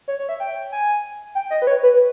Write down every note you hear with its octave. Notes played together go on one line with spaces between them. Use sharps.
C#5
C#5
E5
G5
G#5
G5
D#5
B4
C#5
B4